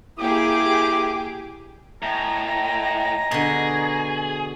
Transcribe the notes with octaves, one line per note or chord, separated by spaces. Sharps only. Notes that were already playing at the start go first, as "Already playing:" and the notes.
A#3 E4 G4 G#4 D6
A2 D#5 G#5 A#5
B2 D3 G#4